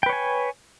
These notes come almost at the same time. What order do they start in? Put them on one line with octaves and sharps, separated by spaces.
G5 B4 C#5 G#5